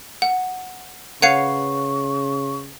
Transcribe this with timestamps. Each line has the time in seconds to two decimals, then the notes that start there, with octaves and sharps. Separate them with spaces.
0.22 F#5
1.22 C#3 B4 C#5 F5 F#5 C#6 C7 C#7